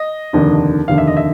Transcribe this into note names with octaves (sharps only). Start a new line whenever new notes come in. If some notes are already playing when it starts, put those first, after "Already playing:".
Already playing: D#5
F1 D#2 D3
F1 D#2 D3 F5
E5
D#5
E5